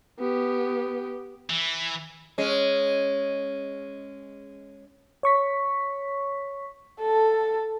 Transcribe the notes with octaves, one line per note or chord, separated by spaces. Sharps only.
B3 G4
E3
G#3 C#4
C#5 C#6 B6
A4